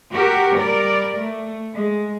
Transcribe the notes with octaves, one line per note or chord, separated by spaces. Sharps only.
F#4 G4 A#4
G3 A#4 D5
A3
G#3